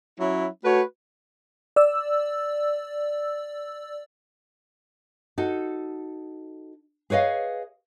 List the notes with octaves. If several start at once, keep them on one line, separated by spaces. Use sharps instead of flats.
F#3 C#4 E4
A3 F#4 B4 C#5
D5 E6
D#4 F#4 A4
G#4 B4 C#5 D#5 F5